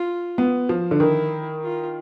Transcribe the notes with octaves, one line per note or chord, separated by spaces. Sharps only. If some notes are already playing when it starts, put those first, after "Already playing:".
Already playing: F4
B3
F3
D3
D#3 E4
F4